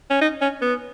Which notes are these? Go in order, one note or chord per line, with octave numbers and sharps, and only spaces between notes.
C#4
D#4
C#4
B3